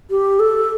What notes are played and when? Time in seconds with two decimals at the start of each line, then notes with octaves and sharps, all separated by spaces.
0.10 G4
0.40 A4